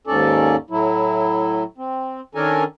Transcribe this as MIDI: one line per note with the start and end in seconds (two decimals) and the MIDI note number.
0.07 0.56 39
0.07 0.56 44
0.07 0.56 61
0.07 0.56 69
0.07 0.56 74
0.70 1.64 45
0.70 1.64 54
0.70 1.64 64
1.78 2.21 60
2.35 2.64 51
2.35 2.64 61
2.35 2.64 62
2.35 2.64 69
2.35 2.64 70
2.35 2.64 80